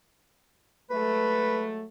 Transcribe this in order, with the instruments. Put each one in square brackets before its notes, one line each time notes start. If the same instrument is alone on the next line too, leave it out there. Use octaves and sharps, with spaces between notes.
[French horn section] F#3 G#3 A3 [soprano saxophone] B4